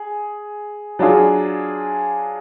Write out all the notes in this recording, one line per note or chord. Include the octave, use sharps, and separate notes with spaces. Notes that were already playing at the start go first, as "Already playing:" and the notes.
Already playing: G#4
F#3 D4 F4 G#4